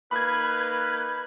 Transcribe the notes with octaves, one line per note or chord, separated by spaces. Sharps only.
A#3 D#4 B4 B5 G#6